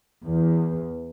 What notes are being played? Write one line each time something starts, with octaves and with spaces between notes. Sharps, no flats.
E2